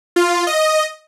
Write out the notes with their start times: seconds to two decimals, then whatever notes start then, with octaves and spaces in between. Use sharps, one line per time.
0.16 F4
0.47 D#5